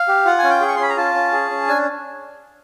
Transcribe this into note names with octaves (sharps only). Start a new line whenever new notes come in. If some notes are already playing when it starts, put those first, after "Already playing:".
Already playing: F5
G4
F4 F#5
G#5
C#4
G5
G#4
C#6
C6
C#4 B5
A#5
F4 A5
C#4
G#4
C#4
D4 G#5